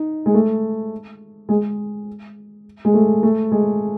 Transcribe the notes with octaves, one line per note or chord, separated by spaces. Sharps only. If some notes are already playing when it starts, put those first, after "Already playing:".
Already playing: D#4
G#3
A3
G#3
G#3
A3
A3
G#3